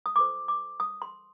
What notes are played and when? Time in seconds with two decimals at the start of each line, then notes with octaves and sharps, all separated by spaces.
0.06 D#6
0.16 F4 A4 C5 D6
0.48 D6
0.80 D#6
1.02 C6